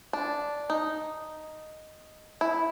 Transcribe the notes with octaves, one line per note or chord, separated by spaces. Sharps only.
D4
D#4
E4